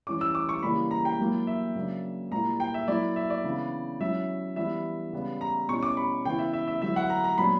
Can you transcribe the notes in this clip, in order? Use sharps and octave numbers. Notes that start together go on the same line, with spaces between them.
E3 G3 C#4 E4 D6
E6
D6
C#6
C#3 E3 G3 A#3 E4 B5
A#5
G5
F#3 A#3 E4
E5
C#3 F#3 A#3 D4
A#2 G3 A#3 E4 A#5
G5
E5
F#3 A#3 E4 D5
E5
D5
C#3 E3 B3 D4
F#3 C#4 E4 E5
E3 G3 B3 E4 E5
C#3 G3 B3
A#5
B2 G3 C#4 E4 C#6
D6
B5
C#3 E3 B3 E4 G5
E5
E5
E5
D3 F#3 B3 E4 E5
F#5
A#5
A#5
A#2 F#3 B3 D4 B5